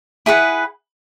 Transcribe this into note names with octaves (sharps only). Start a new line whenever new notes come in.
E4 G#4 B4 F#5